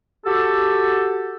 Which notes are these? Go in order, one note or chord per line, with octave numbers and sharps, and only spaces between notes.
F#4 G4 A4